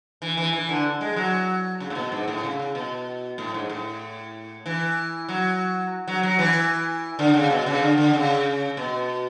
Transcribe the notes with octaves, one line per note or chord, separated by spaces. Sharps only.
E3
E3
E3
D3
G#3
F#3
C#3
A2
B2
G#2
A2
C#3
C#3
B2
A2
G#2
A2
E3
F#3
F#3
F#3
E3
D3
C#3
B2
C#3
D3
D3
C#3
B2